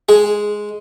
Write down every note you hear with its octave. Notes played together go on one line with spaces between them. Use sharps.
G#3 G#4